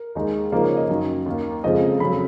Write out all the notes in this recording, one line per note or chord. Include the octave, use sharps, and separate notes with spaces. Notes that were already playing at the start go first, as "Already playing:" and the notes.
Already playing: A#4
D#2 D#3 G#3 D#4
C#3 F3 A#3 D#4 A#4
C#5
D#5
F#2 D#3 F#3
D#2 D#3 A#3
F2 C#3 F3 G#3 D#5
F2 C#3 F#3 B5